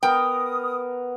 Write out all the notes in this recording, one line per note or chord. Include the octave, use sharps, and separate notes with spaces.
B3 A#4 G5 D#6